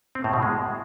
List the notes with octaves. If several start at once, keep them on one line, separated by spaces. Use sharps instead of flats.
C4
A2
B2
G#3